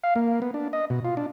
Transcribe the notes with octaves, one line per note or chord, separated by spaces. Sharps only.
F5
A#3
B3
D4
D#5
B2
F4
D4